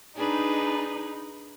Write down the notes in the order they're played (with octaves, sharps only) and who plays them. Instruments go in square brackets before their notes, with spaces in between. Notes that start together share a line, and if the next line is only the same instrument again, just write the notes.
[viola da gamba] D4 G#4 B4 [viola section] D#4